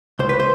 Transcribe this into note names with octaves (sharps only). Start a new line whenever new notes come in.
C#2 C5
B4
C5